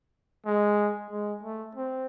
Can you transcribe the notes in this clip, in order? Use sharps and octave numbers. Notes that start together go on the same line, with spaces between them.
G#3
G#3
A3
C4